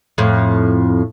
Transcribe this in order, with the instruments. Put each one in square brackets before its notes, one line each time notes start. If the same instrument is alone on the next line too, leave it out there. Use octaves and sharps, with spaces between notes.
[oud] F2 A2